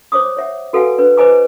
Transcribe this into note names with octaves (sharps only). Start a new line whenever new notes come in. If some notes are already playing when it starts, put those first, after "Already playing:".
C5 C#5 D6 D#6
C#5 E5 F#5
F#4 A4 B4 F5 F#5 G#5
D4 B4
B4 C5 D#5 G#5 A#5 D6